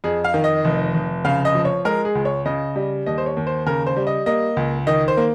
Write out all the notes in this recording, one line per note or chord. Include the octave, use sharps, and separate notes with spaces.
F2 G#4
F5
D#3
D#5
F1
F1
C#3 F5
D#5
F3
C#5
G#3 A#4
G#4
C#2
C#5
C#3 D#5
G3
D#2 D#5
C5
C#5
D#2
C5
C#3 A#4
C5
G3
D#5
A#3 D#5
C#2
D#3 D#5
C5
A#3